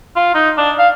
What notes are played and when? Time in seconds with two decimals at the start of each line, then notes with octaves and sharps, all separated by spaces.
0.16 F4
0.35 D#4
0.57 D4
0.78 F5